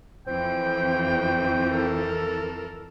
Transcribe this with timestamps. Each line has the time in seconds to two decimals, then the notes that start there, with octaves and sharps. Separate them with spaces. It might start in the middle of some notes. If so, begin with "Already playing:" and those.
0.27 F2 E3 C4 G5
1.70 A4 A#4